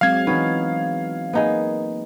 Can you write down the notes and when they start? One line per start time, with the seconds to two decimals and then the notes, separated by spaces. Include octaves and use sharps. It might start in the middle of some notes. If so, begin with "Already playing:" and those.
0.01 F#3 G#3 C4 F5 G#6
0.27 E3 B3 C#4 D#4
1.33 A#3 B3 D#4 G#4